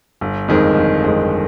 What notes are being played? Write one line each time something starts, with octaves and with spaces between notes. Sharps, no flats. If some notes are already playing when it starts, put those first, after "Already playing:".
G1
F2 D#3 G#3
G1
F2 D#3 G#3